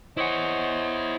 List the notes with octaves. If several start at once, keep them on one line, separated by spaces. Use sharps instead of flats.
E4 C5 C#5 D#5 F#5